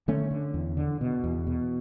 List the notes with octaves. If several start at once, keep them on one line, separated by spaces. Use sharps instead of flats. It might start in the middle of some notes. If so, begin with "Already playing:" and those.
D3 A3 C#4
D3
E2
D3
B2
E2
B2